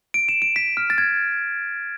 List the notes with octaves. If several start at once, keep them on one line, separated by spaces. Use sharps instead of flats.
D7
E7
D7
B6
F6
A6
G#6